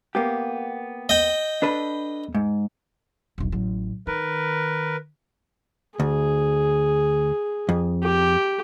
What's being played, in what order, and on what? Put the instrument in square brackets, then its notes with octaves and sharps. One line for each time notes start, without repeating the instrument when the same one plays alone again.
[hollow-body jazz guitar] A#3 B3 G4
[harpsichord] D#5 G5
[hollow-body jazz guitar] D4 A4 B4
G#2
[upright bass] E1 B1
A1 F#3
[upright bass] D#3 [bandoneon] A#4 B4
[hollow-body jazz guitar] D2 [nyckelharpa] G#4
[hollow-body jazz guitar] F2
[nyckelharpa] G4